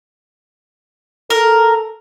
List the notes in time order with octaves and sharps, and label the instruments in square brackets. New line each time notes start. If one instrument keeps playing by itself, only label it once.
[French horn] A4 [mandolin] A#4